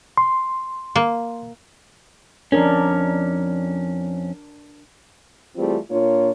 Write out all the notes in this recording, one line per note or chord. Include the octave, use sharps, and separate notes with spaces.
C6
A#3
F2 B2 C#4 D4 A#4
E3 G3 A3 C4 F4 G#4
A#2 A#3 D4 F4 C#5